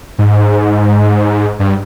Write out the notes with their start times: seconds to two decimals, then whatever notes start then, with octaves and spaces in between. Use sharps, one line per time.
0.19 G#2
1.60 G2